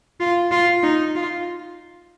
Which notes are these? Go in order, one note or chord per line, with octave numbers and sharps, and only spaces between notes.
F4
F4
D#4
F4